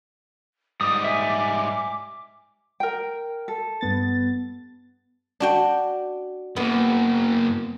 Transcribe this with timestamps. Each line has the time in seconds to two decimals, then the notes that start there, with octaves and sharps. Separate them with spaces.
0.81 G#2 G3 D6 D#6
1.04 E5 G#5
2.80 A#4 G5
3.48 A4
3.81 G2 B3 A6
5.40 D4 F#4 G5
6.56 F#2 A#3 B3